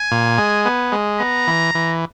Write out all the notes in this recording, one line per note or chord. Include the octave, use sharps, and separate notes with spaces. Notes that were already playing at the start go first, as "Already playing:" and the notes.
Already playing: G#5
A#2
G#3
B3
G#3
B3 A#5
E3
E3